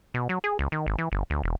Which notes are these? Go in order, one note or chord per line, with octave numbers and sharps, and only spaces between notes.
B2
F#3
G#4
C#2
D#3
G#1
E3
G1
D2
E1